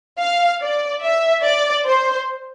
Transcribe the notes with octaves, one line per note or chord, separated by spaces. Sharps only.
F5
D5
E5
D5
C5